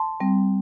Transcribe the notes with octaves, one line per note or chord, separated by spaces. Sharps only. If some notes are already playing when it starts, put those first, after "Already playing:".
Already playing: A5 C6
G3 C4